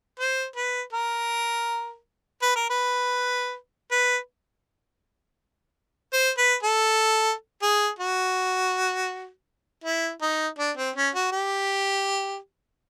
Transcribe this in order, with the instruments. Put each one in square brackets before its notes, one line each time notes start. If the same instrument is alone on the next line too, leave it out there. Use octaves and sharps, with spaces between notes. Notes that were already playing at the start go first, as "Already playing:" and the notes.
[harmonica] C5
B4
A#4
B4
A#4
B4
B4
C5
B4
A4
G#4
F#4
E4
D#4
D4
C4
C#4
F#4
G4